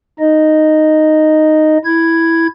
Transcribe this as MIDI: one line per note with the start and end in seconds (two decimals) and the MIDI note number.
0.19 1.77 63
0.19 1.77 75
1.85 2.47 64
1.85 2.47 92